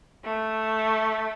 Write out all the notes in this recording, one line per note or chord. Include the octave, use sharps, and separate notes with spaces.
A3